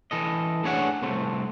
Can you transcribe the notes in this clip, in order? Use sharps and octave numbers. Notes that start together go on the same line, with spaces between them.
E3 A4 D#5
A3 D4 G#4 C#5 E5 F#5
C2 A3 C4